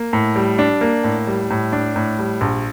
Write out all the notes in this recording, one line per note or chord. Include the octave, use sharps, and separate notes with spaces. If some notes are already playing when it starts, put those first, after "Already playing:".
Already playing: A#3
A2
G3
D4
A#3
A2
G3
A2
D4
A2
G3
A#1